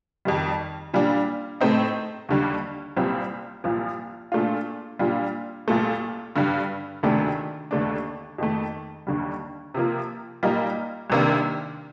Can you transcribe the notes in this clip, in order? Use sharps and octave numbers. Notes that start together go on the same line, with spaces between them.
F2 D#3 G3
A#2 G3 D4
A2 A3 C4 D#4
D#2 D3 G3
C2 A#2 G3 C4
C2 A#2 F3
A#2 A3 D4 F4
A#2 G3 D4 F4
C2 A#2 A3
G2 D3 G3
D2 C3 D#3 A3 D4
D#2 D3 A3 D4
F2 D#3 A3
D#2 D3 G3
C3 F3 A#3
A#2 G3 A#3 D#4
C2 C3 D#3 A#3 D4